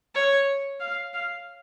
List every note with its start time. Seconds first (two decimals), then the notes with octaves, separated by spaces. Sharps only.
0.15 C#5
0.80 F5
1.13 F5